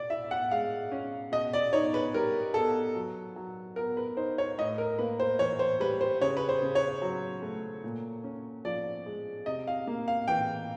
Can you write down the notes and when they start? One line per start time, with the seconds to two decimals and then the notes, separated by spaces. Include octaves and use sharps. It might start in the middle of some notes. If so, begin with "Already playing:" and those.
Already playing: B2 D5
0.10 E4 E5
0.31 F#5
0.51 G#3 F5
0.92 C#4
1.32 B2 D#5
1.53 D5
1.73 D#4 C#5
1.94 B4
2.14 G3 A#4
2.54 B3 A4
2.95 F#3
3.36 F#3
3.76 B3 A#4
3.97 B4
4.17 D#4 C5
4.38 C#5
4.58 A2 D#5
4.78 A#4
4.99 A#3 B4
5.20 C5
5.39 E3 C#5
5.59 C5
5.80 G3 B4
6.01 C5
6.22 C#3 C#5
6.37 B4
6.49 C5
6.62 C#3
6.75 C#5
7.02 F#3
7.42 A3
7.84 A#2
8.24 C#4
8.65 F3 D5
9.06 G#3
9.46 C3 D#5
9.67 F5
9.87 A#3
10.08 F5
10.28 E3 G5